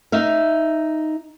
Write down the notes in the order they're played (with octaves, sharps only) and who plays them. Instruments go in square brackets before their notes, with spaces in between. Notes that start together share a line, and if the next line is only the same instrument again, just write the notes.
[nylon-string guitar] D#4 E5 F5